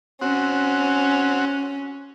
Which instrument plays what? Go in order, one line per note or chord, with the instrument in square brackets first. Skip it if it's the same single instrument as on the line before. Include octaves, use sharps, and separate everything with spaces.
[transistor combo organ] C4 F#4 [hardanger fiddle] C#4